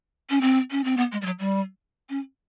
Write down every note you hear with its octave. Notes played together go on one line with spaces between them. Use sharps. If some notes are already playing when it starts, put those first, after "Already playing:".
C#4
C4
C#4
C4
B3
G#3
G3
F#3
G3
C#4